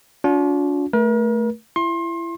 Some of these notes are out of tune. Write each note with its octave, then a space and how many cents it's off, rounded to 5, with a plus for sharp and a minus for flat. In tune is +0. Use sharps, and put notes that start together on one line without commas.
D4 -40 F4 +45
A3 +0 A#4 +40
E4 +30 C6 +30